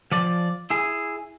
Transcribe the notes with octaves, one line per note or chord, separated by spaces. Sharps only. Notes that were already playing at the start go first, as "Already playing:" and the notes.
F3 D5
E4 G#4